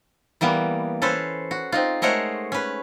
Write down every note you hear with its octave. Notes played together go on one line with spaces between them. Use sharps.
E3 G3 A#3 B3
C#4 A4 B4 C5
F#4
C4 D#4 F4
G#3 A3 A#4 C5 C#5 F#5
C#4 B4